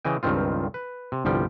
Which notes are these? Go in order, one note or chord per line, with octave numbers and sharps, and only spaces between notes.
C#3 E3 D#5 G5
C#2 G2 D#3 C4 F4
B4
C3
G1 C2 F3 G3 G5